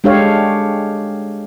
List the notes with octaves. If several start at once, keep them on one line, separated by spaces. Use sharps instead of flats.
G#3 D4 G4 A4 C#5 F5